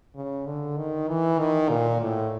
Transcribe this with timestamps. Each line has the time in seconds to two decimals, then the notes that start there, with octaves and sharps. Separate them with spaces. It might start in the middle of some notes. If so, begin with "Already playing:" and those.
0.16 C#3
0.46 D3
0.77 D#3
1.09 E3
1.39 D#3
1.70 A#2
2.02 A2